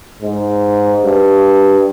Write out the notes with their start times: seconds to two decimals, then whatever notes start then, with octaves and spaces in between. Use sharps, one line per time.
0.22 G#2
1.04 G2